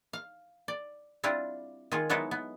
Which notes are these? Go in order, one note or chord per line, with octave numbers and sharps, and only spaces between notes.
F5
D5
G3 C4 D4 E4 F4
D#3 G#3 F4 G#4
F#3 G#3 B3 D#4 E4 A4
B3